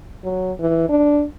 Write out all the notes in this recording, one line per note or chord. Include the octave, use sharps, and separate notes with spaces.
F#3
E3
D4